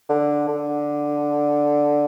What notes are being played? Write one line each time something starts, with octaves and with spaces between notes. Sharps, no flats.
D3
D3